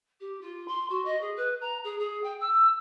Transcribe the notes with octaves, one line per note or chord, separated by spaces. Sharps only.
G4
F4
C6
F#4
D#5
G#4
B4
A#5
G#4
G#4
G5
E6